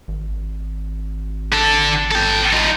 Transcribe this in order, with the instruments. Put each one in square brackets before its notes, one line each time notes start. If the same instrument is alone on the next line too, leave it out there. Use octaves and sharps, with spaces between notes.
[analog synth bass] G#1
[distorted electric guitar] D3 A4
A4 G5
D#4 F4